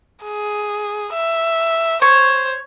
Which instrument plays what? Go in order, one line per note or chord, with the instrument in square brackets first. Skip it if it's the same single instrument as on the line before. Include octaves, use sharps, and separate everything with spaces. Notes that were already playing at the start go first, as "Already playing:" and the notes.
[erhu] G#4
E5
[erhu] C5 [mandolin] C#5